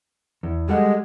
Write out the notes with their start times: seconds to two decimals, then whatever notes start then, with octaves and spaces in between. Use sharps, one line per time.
0.43 E2
0.69 G3 G#3 A4 F#5